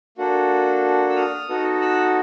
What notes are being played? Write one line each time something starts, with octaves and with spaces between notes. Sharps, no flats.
A#3 D4 F#4 A4
E6
D#6 F6
B3 D#4 F#4 A4
E6 F#6